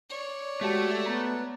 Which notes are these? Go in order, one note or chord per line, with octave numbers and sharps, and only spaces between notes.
C#5 D5
G#3 A3 F#4 G4 A5
B3 A#5